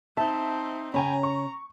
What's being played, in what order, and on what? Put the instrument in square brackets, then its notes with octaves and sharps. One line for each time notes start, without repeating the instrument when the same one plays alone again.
[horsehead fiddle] C4 D#4 [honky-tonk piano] E5 [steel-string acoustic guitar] A5
[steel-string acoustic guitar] C#3 C#4 [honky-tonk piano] G5 G#5 B5 [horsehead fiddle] A#5
[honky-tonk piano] C#6